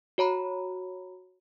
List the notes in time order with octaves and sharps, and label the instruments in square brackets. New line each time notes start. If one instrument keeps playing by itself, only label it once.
[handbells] F#4 C#5 A#5 B5